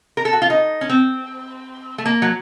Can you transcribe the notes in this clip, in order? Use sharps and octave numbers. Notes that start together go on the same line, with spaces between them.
A#4
A4
F#4
F4
D#4
C#4
C4
A3
A#3
F#3